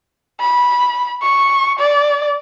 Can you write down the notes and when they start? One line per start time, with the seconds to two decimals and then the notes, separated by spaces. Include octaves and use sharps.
0.40 B5
1.22 C#6
1.79 D5